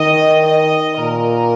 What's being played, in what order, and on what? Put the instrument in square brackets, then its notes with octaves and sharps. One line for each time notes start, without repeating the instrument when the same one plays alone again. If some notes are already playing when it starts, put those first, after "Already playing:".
Already playing: [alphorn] D#3 [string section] D#5
[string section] D#5
[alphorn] A#2 [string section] A#4